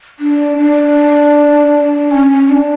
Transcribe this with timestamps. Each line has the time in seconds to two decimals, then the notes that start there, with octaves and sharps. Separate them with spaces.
0.19 D4
0.58 D4
2.11 C#4
2.32 C#4
2.49 D4